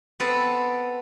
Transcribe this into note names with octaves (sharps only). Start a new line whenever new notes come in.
B3 C4 A4 B4